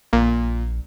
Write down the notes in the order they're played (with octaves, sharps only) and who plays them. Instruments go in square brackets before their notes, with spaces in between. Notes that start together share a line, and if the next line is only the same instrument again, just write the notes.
[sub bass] A#1 [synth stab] A#2